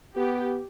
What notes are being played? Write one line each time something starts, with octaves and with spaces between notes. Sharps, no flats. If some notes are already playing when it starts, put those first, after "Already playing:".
B3 G4